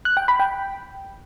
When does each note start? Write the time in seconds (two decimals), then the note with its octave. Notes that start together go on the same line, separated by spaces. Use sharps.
0.05 F#6
0.17 G5
0.28 B5
0.40 G5